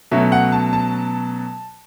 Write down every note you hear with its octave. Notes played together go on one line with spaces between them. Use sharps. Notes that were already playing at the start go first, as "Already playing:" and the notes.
B2 F#3 A3 C#4 E5
F#5
A5
A5